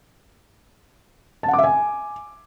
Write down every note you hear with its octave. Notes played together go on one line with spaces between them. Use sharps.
A5
F#5
D6
E5
G#5